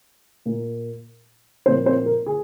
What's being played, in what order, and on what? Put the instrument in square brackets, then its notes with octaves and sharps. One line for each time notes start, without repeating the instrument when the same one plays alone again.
[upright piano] A#2 A#3
A#2 F3 A#3 C4 C5
C4 C5
A#4
G#4